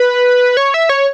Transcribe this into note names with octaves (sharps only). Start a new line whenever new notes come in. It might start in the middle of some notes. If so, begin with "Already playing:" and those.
Already playing: B4
C#5
E5
C#5